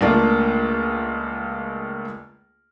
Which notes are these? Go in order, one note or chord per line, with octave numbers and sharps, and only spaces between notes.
C#2 A3 A#3 D4 F4